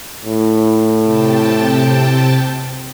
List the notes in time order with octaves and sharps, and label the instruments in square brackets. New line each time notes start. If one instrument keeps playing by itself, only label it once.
[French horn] A2
[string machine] C3 G5 A5